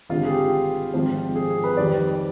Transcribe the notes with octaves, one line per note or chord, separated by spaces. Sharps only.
G#1 G2 D3 G#3 F4
G#4
G4
G#1 G#2 F3 G#3 C4
G#4
G#4
B4
F2 D#3 G3 D5